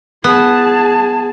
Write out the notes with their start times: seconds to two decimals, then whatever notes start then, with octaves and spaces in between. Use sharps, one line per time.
0.24 B3 G#4 A5